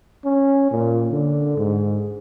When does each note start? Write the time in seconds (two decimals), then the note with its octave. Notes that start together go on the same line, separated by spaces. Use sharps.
0.24 C#4
0.71 A#2
1.11 D3
1.57 G#2